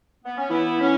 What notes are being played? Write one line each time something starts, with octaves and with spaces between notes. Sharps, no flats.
B3
C#4
E3 B3 E4
C#4